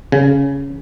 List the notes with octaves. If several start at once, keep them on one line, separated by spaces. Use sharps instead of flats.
C#3